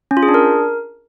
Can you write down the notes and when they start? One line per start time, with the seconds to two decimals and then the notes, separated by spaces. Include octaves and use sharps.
0.11 C#4
0.17 F4
0.23 G#4
0.28 D4
0.34 A#4